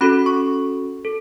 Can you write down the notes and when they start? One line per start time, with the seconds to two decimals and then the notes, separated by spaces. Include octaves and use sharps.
0.01 C#4 F#4 A4 B5
0.26 C#6
1.05 A4